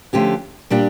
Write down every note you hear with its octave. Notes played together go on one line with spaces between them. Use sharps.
D3 F3 A3 C#4 G4
A#2 G3 D4 G4